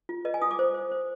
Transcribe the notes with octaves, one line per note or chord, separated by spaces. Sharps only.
F4
B4 D#5
G#5
F4 D#6
D6
C5
C5
C5